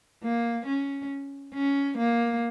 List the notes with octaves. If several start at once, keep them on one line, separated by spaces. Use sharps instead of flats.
A#3
C#4
C#4
A#3